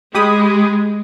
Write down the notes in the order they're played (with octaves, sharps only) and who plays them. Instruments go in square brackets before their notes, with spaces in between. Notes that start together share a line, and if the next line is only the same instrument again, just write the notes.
[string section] G#3 [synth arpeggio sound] G4 B5 D#6